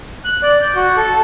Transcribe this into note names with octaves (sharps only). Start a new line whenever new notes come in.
F#6
D5
G6
F#4
A4